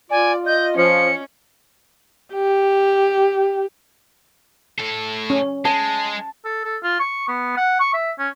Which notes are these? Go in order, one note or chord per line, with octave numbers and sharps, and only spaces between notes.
F4 D5 G#5
D#5 G6
F3 C#4 C#7
G4
A2 A4
C#4
G#3 A5
A4
A4
F4
C#6
B3
F#5
C#6
E5
C#4